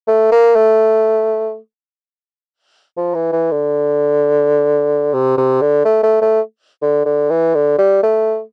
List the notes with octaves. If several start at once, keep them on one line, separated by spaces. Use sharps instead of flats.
A3
A#3
A3
F3
E3
E3
D3
C3
C3
D3
A3
A3
A3
D3
D3
E3
D3
G3
A3